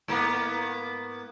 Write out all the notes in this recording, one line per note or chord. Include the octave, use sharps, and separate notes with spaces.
G#2 A#3 B3